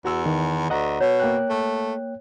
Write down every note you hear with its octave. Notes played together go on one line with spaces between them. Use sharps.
E2 F#4 E6
D#3
D2 D#5 F#5 A#5
B2 C#5
A#3 G5 F#6
A3